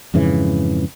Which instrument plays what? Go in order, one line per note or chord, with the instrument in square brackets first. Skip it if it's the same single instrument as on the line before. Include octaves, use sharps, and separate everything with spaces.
[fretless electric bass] F2 G#2 C#3 E3